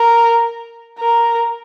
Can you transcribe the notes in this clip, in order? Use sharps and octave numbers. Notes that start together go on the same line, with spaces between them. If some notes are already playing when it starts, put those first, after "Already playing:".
Already playing: A#4
A#4